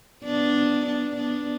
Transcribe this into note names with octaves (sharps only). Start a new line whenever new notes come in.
B3 D4
B3 D4
B3 D4